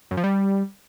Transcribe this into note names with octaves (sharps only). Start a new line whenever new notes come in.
F#2
F3
G3